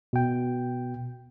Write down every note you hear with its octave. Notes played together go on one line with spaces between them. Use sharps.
B2 G5